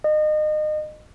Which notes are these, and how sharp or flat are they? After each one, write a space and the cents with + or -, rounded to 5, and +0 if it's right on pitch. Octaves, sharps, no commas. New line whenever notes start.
D#5 -30